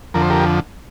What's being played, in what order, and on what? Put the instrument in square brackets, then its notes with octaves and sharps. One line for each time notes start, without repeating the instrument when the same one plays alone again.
[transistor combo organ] F2 D3 F3 A#4
C5
G4 A#4